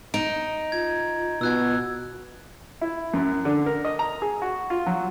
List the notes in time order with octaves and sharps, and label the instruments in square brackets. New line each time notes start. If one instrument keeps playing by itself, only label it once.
[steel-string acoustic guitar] D#4 [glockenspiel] A#5 D7
[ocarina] F4 [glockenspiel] G#6
[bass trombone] B2 [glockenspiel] E6 F#6 G#6
[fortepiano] E4
F#2
D3
A#4
D#5
A#5
G#4
F#4
F4
F#3